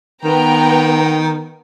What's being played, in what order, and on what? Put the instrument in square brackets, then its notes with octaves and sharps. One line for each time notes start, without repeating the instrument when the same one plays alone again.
[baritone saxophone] D#3 [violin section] B3 G5 A#5